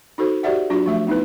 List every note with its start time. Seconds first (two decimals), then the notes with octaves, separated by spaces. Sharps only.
0.18 D#4 F#4 A4 C5
0.43 F#4 G4 C5 D5 E5 F#5
0.70 F#3 D4 F4 F#4
0.86 F3 A3 E5
1.07 B3 D#4 E4 B4